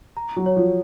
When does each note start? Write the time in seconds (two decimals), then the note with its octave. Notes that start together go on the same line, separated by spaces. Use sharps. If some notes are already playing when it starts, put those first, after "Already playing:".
0.17 A#5
0.36 F#3
0.46 C#5
0.56 F3